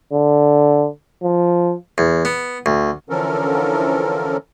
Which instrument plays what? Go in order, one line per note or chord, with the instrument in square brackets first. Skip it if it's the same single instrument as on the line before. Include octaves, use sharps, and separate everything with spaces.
[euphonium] D3
F3
[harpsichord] E2
B3
D2
[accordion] D3 E3 F3 C#4 A4 A#4